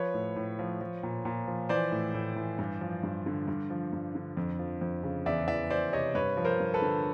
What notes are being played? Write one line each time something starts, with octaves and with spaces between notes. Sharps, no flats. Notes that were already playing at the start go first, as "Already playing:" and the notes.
Already playing: F3 B4 C#5
A2
A2
F3
F3
A#2
A#2
F3
E3 C5 D5
A2
A2
E3
G2
F3
G2
D3
G2
F3
G2
D3
F2
F3
F2
C#3
E2 D5 E5
E3 D5 E5
E2 C5 D5
C3 C#5 D#5
G2 B4 C#5
F3
A#4 C5
G2
A4 B4
D3